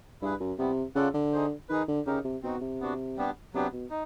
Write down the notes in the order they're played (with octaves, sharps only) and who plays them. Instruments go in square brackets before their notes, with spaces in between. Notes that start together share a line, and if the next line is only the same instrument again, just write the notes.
[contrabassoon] G2 [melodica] E4 G#4 B4
[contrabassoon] F#2
[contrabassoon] C3 [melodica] G3 B3 E4
[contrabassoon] C#3 [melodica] F4 A4 D5 F#5
[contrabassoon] D3
[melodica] D#4 G#4 C5
[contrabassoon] D#3 [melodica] D#4 G#4 B4
[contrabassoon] D3
[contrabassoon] C#3 [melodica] D#4 G4 A#4
[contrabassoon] C3
[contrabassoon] B2 [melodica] C4 D#4 F#4
[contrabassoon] C3
[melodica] B3 D4 F#4
G3 B3 D4 G4
[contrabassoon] C3 [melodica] F#3 B3 D4 G4
[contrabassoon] B2
[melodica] D#4